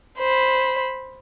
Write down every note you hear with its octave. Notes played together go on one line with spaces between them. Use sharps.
C5 B5